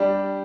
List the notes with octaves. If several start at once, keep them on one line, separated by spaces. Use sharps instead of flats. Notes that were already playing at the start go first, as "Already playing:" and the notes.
Already playing: G3 D4 G4